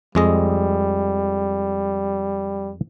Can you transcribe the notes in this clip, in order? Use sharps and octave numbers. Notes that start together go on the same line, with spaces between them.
F2 G3 G#3 D#5